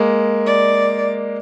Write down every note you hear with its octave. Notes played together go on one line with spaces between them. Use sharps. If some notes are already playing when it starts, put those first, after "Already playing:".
Already playing: G#3 A#3
D5